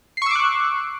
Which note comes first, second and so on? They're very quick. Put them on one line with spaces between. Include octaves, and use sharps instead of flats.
C7 C#6 E6 D6 F#6